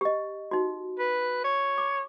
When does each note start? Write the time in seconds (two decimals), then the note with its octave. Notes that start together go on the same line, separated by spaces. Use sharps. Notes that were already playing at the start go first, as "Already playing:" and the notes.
0.01 G4 D#5
0.51 D#4 F#4
0.99 B4
1.44 C#5
1.78 D6